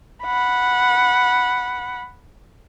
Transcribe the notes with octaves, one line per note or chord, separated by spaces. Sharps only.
F#5 B5